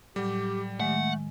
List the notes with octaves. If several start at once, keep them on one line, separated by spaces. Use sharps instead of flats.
A2 F#3 G3 G4
D#3 G#3 A3 F#5